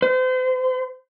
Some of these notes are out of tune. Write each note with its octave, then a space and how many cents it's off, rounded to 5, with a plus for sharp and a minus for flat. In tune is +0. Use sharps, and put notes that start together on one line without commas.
C5 -35